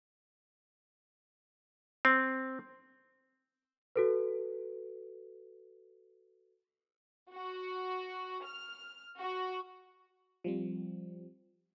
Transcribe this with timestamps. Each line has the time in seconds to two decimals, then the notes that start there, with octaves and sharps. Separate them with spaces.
2.05 C4
3.96 F#4 A4 B4
7.32 F#4
8.45 F6
9.20 F#4
10.44 F3 G3 C4